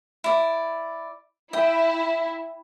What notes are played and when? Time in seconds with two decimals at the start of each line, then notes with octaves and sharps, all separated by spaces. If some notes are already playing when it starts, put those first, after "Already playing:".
0.24 E4 D5
1.53 E4 E5 G5 D#6